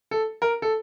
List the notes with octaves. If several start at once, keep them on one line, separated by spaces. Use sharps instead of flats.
A4
A#4
A4